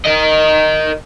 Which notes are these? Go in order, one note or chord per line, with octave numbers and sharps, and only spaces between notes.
A#4 D#5